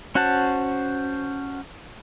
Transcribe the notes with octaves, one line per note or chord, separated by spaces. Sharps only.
C#4 F#4 C5 F#5 A5